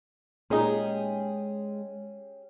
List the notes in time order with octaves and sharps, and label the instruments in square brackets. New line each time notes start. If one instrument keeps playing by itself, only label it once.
[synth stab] A#2 D#4 [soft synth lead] G#3 [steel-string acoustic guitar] C#4 G4 G#4